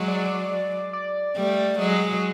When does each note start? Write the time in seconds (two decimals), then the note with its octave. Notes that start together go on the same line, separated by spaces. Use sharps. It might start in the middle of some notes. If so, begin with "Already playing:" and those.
Already playing: F#3 G#3
0.08 D5
0.93 D5
1.36 G3 A3 D5
1.79 F#3 G#3 D#5